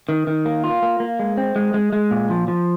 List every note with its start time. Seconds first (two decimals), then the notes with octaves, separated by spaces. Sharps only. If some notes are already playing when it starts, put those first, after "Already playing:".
0.09 D#3
0.27 D#3
0.46 A#3
0.64 F4
0.82 A#3
1.00 A#3
1.19 G#3
1.37 C4
1.56 G#3
1.74 G#3
1.93 G#3
2.11 A#2
2.30 F3
2.48 F3